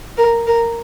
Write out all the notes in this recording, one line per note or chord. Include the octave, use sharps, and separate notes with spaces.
A#4
A#4